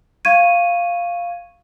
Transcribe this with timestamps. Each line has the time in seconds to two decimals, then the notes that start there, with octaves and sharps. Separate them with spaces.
0.25 F5 C#6 G#6 D#7